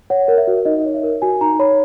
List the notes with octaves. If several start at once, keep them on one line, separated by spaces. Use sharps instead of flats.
C#5 F#5
A#4
E5
F#4
D#4 D#5
C#5
E5
A#4
F#4 G#5
D#4 A#5
C#5 B5